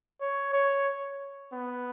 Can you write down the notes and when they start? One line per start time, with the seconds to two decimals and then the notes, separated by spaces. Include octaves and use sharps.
0.21 C#5
0.53 C#5
1.53 B3